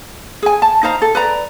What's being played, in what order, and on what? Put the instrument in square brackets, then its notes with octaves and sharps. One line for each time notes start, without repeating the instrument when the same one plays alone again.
[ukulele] G#4 G#5
A5
D#4 C5 F5 A#5
A4
B4 D5 A#5